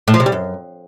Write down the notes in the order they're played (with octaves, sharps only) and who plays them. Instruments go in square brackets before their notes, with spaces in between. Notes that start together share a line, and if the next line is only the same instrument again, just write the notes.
[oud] A2
F3
C3
G3
F#2